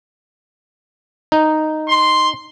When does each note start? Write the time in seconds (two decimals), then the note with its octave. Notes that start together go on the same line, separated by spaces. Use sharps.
1.32 D#4
1.88 C6